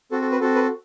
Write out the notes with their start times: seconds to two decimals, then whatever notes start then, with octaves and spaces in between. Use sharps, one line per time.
0.11 C4 F#4 A4
0.22 A4
0.32 B4
0.41 C4 F#4 A4
0.55 B4